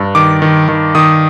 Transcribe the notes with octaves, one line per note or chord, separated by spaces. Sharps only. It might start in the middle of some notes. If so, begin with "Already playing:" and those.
Already playing: G2
D#3 D6
D#3
D#3
D#3 D#6